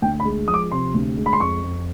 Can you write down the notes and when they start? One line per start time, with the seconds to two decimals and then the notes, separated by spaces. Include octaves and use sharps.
0.02 D2 G5
0.20 B5
0.25 G#3
0.48 F3 D#6
0.54 D6
0.72 C3 C6
0.94 D2
1.17 G#3
1.26 B5
1.33 C6
1.40 F2 C#6
1.63 F2